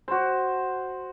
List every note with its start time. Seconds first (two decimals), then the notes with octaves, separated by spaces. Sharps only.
0.08 F#4 C5